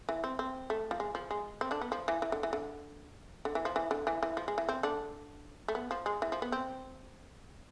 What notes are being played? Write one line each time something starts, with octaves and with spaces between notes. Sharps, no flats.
E3
C4
C4
A3
F3
G#3
F3
G#3
C4
D3 D4
B3
F3
E3
E3
D3
E3
D3
D3
E3
F3
E3
D3
E3
E3
F3
G#3
E3
C4
D3 D4
A3
B3
F3
G#3
E3
F3
B3
C4